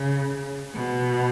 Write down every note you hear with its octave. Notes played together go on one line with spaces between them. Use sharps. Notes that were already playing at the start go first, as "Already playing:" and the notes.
Already playing: C#3
B2